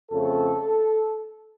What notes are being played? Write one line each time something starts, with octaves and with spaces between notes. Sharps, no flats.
F2 C#3 A3 C4 A4